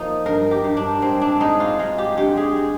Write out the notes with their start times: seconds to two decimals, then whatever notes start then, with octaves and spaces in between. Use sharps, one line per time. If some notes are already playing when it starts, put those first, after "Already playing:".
Already playing: F3 A#3 D#4
0.26 G2 A#4
0.51 G4
0.64 G2
0.77 D4
1.02 G#3 C4
1.21 D4
1.40 G#3 D#4
1.60 F4
1.79 G#3 F4
1.98 G4
2.17 D3 G4
2.37 G#4
2.56 G#3